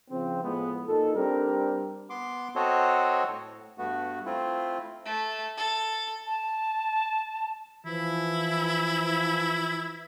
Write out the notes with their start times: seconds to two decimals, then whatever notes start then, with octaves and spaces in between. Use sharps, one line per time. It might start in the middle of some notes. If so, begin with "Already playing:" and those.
0.10 C#3 F3 C4
0.44 A2 F3 G#3 B3
0.87 A#2 D#4 A4
1.16 G3 C4 D4 A#4
2.10 B3 C6 D6
2.56 C4 F#4 A4 C5 C#5 D#5
3.28 A2
3.78 G2 A3 B3 F#4
4.26 A3 C4 E4 F4
5.05 A3
5.57 A4
6.26 A5
7.85 E3 F3 E4